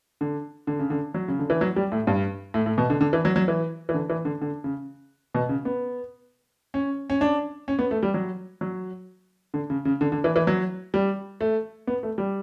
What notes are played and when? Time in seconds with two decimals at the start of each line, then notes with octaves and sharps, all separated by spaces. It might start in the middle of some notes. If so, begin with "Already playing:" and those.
0.21 D3
0.67 D3
0.79 C#3
0.90 D3
1.14 F#3
1.28 C#3
1.39 D3
1.50 E3
1.61 F#3
1.76 G3
1.92 A2
2.07 G2
2.54 A2
2.66 A2
2.78 B2
2.90 D3
3.01 D3
3.13 E3
3.25 F#3
3.36 F#3
3.48 E3
3.89 E3
3.94 D3
4.10 E3
4.25 D3
4.41 D3
4.64 C#3
5.34 B2
5.49 C#3
5.65 B3
6.74 C#4
7.10 C#4
7.21 D4
7.68 C#4
7.79 B3
7.91 A3
8.03 G3
8.14 F#3
8.61 F#3
9.54 D3
9.70 C#3
9.85 C#3
10.01 D3
10.12 D3
10.24 E3
10.36 E3
10.47 F#3
10.94 G3
11.41 A3
11.87 B3
12.03 A3
12.18 G3